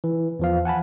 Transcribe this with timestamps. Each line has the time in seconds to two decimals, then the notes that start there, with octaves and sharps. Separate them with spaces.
0.04 E3
0.39 E2 F3 F5
0.65 F#5 G#5 A5 B5